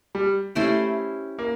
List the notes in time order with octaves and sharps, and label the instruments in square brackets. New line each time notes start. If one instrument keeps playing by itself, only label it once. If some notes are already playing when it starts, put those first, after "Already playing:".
[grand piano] G3
[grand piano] A3 [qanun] C#4 E4 G4 C5
[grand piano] A#3